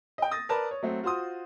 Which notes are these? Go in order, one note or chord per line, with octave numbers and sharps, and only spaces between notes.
D#5 G5
D#6 A6 A#6
A#4 B4 D5 A5
C#5
F#3 A3 C4
F4 F#4 C5 C6 D#6